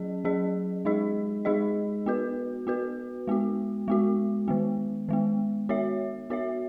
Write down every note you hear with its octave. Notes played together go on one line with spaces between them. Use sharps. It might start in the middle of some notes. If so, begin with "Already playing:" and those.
Already playing: F#3 C#4 G#4 D#5
F#3 C#4 G#4 D#5
G#3 D#4 G#4 D#5
G#3 D#4 G#4 D#5
B3 F#4 B4
B3 F#4 B4
G#3 B3 F#4
G#3 B3 F#4
D#3 G#3 B3
D#3 G#3 B3
B3 F#4 C#5 E5
B3 F#4 C#5 E5